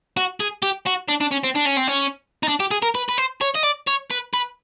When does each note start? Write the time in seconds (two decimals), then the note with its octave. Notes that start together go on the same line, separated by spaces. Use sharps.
0.17 F#4
0.40 G#4
0.63 G4
0.87 F#4
1.09 D4
1.21 D4
1.32 C#4
1.44 C4
1.56 D4
1.66 C#4
1.77 C4
1.88 C#4
2.43 D#4
2.48 D4
2.60 G4
2.71 G#4
2.83 A#4
2.95 B4
3.09 B4
3.18 C5
3.42 C#5
3.55 D#5
3.64 D5
3.88 C#5
4.11 B4
4.34 B4